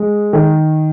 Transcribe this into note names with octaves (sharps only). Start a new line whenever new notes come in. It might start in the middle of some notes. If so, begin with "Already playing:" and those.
Already playing: G#3
D#3